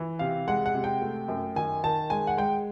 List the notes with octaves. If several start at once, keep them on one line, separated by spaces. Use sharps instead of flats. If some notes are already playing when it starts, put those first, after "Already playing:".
Already playing: E3
C3 F5
G#3 F#5
F#5
C3
G5
A3
F#2
D#3 G#5
D#3 A5
G#3 G#5
F#5
G#3 G5